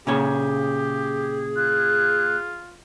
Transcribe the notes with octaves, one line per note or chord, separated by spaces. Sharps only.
A#2 C#3 G4 G#4 C#5
F4 F#6